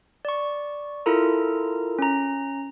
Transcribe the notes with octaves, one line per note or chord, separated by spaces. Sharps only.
D5 C#6
E4 F4 A4 A#4 A#5
C#4 A#5